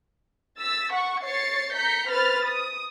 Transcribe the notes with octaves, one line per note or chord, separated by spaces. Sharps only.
E6 A6 B6
F#5 C#6
C#5 A6 C7 C#7
A#5 G6 B6 C#7
B4 C5 B5 F6 A6
D#6